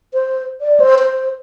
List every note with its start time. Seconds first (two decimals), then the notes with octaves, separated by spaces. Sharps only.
0.14 C5
0.61 D5
0.80 C5
0.99 C5